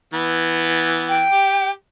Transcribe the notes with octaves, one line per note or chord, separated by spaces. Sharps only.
E3 B3
G5
G4